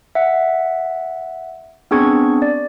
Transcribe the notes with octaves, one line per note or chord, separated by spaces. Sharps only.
E5 F#5
B3 C4 D4 G#4 C#6 G#6
D5